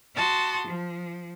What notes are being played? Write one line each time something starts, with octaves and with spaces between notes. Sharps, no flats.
F#4 A5 C6 D#6
F3